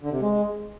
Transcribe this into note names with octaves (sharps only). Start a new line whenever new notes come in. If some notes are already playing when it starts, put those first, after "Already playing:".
D3
C3
G#3